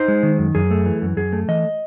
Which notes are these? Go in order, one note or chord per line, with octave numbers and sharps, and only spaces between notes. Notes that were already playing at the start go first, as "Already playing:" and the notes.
Already playing: D#4 C5
G#3
D#3
F#2
F#2 G#4
A3
E3
F#2
F#2 G#4
A3
E3 D#5